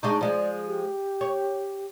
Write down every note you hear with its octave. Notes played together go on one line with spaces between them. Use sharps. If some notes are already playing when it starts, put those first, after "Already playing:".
G#3 D4 D#4 C#6
F3 G#3 D5
G4
C#5